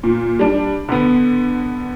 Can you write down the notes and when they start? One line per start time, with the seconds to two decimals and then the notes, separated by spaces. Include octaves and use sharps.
0.03 A#2
0.39 G3 D4
0.89 D3 B3